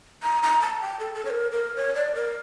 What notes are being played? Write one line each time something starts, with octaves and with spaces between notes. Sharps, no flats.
A#5
A#5
A5
G5
A4
A4
C#5
A#4
A#4
C#5
D5
A#4